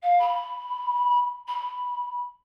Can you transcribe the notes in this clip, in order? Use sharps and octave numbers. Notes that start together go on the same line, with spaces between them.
F5
B5
B5